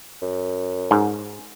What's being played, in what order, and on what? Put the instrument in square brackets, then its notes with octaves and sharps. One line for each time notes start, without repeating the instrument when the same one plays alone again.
[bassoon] F#2
[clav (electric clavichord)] G#2